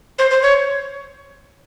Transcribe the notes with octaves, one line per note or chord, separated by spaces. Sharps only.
C5
C5
C#5